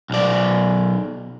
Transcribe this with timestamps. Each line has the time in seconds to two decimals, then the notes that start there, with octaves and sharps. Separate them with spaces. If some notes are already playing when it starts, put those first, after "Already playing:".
0.10 B1 D5